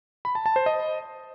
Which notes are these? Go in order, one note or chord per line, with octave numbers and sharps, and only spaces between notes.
B5
A5
A5
C5
D#5